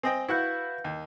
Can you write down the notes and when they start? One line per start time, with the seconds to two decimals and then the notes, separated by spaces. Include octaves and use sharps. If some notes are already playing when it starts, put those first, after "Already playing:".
0.03 C4 D#5 G5 G#5
0.28 E4 F#4 B4 F5 F#5 G6
0.84 D#2